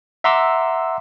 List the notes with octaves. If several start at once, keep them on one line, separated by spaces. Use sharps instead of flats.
E5 F#5 A#5 C6 D6 E6